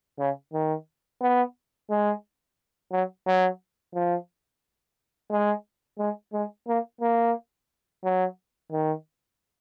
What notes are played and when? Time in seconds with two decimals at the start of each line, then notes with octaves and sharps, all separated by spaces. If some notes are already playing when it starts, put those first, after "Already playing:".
0.19 C#3
0.53 D#3
1.21 B3
1.90 G#3
2.92 F#3
3.26 F#3
3.94 F3
5.31 G#3
5.99 G#3
6.33 G#3
6.68 A#3
7.01 A#3
8.04 F#3
8.71 D#3